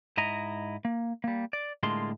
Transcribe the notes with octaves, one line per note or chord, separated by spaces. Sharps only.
G#2 E4 D#5 A#5
A#3
G3 A#3
D5
A2 D3 G#3 A#3 F4 C6